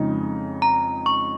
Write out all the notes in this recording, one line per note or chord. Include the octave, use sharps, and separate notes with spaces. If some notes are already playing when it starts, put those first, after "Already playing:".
Already playing: F2 C#3 G#3 D#4
A#5
C#6